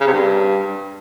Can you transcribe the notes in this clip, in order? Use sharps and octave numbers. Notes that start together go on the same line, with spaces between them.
C#3
C3
G2